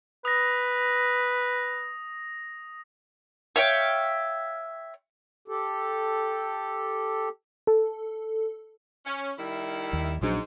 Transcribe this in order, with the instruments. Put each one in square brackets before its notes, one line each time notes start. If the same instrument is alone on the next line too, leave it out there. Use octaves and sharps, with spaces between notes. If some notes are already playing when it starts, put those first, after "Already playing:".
[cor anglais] B4 [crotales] D#6 A#6
[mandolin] C#5 E5 F5 G5
[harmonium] G4 A4
[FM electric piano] A4
[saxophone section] C#4
D#3 G3 E4
[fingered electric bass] D#2
[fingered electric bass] A#1 F#3 D4 [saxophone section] G#2